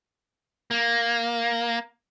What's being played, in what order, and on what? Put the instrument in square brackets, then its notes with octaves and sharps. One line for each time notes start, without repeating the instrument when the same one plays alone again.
[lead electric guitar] A#3